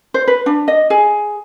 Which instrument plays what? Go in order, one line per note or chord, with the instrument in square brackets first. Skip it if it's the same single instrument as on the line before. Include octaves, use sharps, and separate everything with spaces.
[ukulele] C5
B4
D4
D#5
G#4